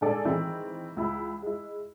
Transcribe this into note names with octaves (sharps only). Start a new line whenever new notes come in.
G#2 D3 G#4 A4 D5 G#5
D#3 E3 G#3 C4 E4
C#2 E4 B5
G#3 E4